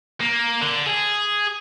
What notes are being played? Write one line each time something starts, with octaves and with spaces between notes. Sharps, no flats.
A#3
D3
G#4